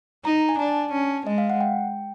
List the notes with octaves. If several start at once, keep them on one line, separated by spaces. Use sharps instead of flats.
D#4 A#5
G#5
D4 A5
C#4
G#3 D#5
F5
F#5
G5